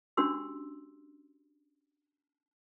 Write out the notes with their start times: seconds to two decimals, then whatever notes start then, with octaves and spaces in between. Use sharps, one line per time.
0.17 C#4 D4 F#4 G4 C6 E6